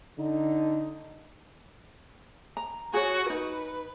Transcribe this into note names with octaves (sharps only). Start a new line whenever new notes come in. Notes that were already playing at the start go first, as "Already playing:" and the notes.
D3 D#4
A#5
F#4 G#4 C#5
D#4 B4